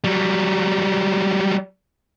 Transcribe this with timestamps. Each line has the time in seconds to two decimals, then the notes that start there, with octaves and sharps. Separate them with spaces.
0.04 F#3 G3